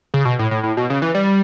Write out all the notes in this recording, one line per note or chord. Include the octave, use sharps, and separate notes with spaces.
C#3
B2
A2
A2
A2
B2
C#3
E3
G3